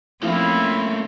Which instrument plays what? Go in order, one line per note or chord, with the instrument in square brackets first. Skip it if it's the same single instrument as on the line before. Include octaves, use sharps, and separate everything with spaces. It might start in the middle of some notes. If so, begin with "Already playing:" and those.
[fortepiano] F3 [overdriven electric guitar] A3 A#3 [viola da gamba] C4 C#4 [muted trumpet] E4